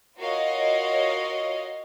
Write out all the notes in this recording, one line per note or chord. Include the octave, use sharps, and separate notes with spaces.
F4 F#4 A#4 C#5 D#5 F5